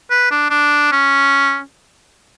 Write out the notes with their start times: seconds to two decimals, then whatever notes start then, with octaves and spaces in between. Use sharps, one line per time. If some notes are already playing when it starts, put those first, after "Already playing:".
0.10 B4
0.31 D4
0.50 D4
0.92 C#4